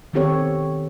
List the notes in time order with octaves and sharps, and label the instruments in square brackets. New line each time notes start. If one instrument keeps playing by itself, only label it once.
[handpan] D#3 B3 C4 G4 A4 C#5